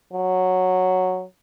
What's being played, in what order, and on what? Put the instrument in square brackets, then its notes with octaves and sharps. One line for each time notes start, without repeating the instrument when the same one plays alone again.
[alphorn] F#3